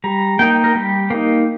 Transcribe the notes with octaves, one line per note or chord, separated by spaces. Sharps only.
G3 A#5
A#3 D#4 G5
A#4
G3 G4
A#3 D#4